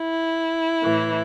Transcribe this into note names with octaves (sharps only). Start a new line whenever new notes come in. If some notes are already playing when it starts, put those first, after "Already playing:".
Already playing: E4
A2 E3